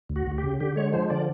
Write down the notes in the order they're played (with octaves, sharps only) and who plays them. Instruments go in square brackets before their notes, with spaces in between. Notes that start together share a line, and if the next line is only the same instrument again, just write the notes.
[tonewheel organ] D2
F#4
D2
G4
C#3
D3 G4
G#3 C#5
F3 C5
D3 D5